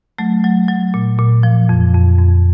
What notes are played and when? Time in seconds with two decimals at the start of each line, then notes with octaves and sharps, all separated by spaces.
0.19 F#3 A3
0.44 F#3
0.68 F#3
0.94 A#2
1.19 A#2
1.43 F3
1.69 F2
1.94 F2
2.18 F2